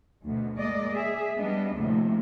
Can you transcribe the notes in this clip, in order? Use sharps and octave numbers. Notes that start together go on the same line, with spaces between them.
D2 B2
G#3 A#3 D5 D#5
G#4 E5
G3 B3 D4 D#5
D2 A2 C3 F3 A#3